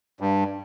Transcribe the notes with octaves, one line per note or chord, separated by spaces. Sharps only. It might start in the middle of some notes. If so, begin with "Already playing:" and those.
G2